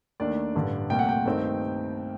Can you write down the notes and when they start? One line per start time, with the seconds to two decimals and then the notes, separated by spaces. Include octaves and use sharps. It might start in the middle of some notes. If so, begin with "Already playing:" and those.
0.20 D#2 D#3 A3 D4 D5
0.55 A1 G2 D3
0.90 C2 A#2 A3 G5
0.99 F#5
1.09 G5
1.26 G2 D#3 A3 C4 D#4